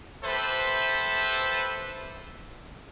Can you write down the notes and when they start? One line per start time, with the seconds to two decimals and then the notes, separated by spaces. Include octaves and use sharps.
0.24 G4 A4 B4 C5 E5